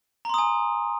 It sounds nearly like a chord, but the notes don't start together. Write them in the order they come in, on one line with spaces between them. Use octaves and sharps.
A#5 C6 D#6 G#5